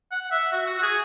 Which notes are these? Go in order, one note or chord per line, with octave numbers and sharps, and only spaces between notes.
F#5
E5
F#4
F#4
F#4
G#4